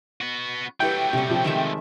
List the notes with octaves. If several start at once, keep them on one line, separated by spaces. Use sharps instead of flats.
B3 F#4
F#3 A3 E4 G4 B4 G5
C3 G3 C#4
C3 F3 G4
D#3 G#3 E5